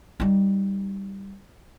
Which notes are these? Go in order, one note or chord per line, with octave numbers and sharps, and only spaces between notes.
G3 D#4